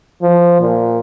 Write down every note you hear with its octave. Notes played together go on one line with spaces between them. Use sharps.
F3
A#2